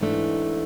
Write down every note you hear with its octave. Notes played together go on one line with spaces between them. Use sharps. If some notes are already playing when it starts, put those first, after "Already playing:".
G#2 E3 A3 D4